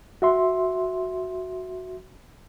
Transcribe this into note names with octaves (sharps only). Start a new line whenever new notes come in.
F#4 E5 C6